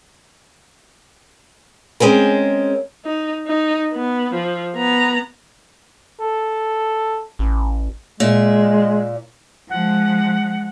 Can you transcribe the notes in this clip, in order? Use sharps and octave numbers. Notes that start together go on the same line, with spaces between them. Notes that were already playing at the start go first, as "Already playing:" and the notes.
G#3 C4 C#4 A#4
D#4
D#4
B3
F3
B3 A#5
A4
A1
A#2 G#3 E5
F3 G#3 F#5